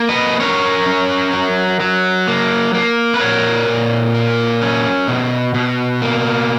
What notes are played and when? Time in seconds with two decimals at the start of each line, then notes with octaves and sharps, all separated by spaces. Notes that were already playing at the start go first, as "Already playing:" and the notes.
Already playing: A#3
0.09 B4 D#5
0.40 C#4 A#4 C#5
0.86 C#4
1.33 F#3
1.80 F#3
2.28 A#3
2.74 A#3
3.14 B4
3.20 A#2 A#4 C#5
3.68 A#2
4.14 A#3
4.62 C#4
5.08 B2
5.54 B2
6.02 A#3